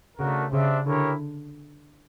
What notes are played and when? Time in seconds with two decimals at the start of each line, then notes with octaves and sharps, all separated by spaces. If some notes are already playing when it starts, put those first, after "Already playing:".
0.18 C#3 A3 D4 F#4 A#4
0.52 C#3 D4 G4 C5 E5
0.86 D3 E4 G4 A#4 C#5